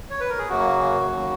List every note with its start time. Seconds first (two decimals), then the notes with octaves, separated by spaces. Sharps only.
0.10 C#5
0.20 B4
0.30 A#4
0.39 G#4
0.49 F#2 C#3 F#3 A#3 F#4
1.09 D#2 C#3 F#3